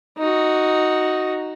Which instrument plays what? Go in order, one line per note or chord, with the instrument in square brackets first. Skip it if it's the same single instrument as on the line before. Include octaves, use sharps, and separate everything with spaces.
[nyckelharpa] D#4 F#4